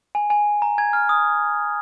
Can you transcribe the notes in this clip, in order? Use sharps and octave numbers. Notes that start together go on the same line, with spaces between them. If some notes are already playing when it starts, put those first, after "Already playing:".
G#5
G#5
A#5
G#5 G#6
F6
D#6